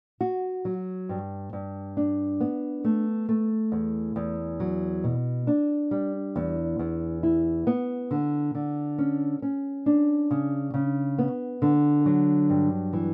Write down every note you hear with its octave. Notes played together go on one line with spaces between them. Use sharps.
F#4
F#3
G2
G2
D4
B3
A3
A3
E2
E2
F#3
B2
D4
G3
E2
E2
E4
B3
D3
D3
C#4
C#4
D4
C#3
C#3
B3
D3
F#3
G2
E3